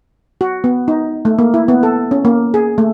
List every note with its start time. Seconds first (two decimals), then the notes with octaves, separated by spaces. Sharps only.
0.41 F#4
0.64 B3
0.88 D#4
1.25 A3
1.39 A#3
1.54 E4
1.68 B3
1.83 A4
2.11 C#4
2.25 A#3
2.54 G#4
2.78 A3